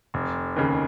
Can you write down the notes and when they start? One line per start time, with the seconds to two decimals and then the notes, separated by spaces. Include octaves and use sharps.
0.14 F1
0.56 D#2 C#3